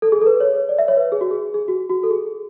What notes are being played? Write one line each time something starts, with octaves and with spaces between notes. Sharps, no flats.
A4
G#4
A4
B4
C#5
C#5
D5
E5
C#5
B4
G#4
F#4
G#4
G#4
F#4
F#4
A4
G#4